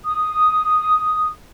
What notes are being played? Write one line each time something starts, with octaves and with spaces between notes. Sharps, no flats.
D#6